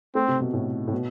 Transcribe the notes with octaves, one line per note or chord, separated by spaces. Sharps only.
A3 C4
C3
B2
A2
A2
B2